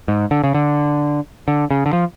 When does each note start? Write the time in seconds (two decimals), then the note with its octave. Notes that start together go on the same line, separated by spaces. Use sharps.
0.08 G#2
0.31 D3
0.44 C#3
0.55 D3
1.48 D3
1.71 C#3
1.86 D3
1.93 F3